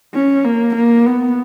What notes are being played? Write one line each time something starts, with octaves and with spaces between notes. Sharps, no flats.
C#4
A#3
A#3
B3